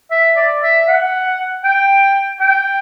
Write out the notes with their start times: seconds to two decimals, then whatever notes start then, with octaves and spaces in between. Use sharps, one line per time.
0.11 E5
0.36 D5
0.62 E5
0.87 F#5
1.64 G5
2.40 G5